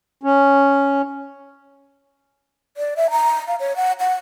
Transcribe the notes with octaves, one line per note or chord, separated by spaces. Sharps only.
C#4
D5
E5
A#5
F5
C#5
F#5
F#5